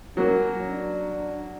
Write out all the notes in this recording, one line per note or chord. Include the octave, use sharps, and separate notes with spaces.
F#3 A#3 C#4
D4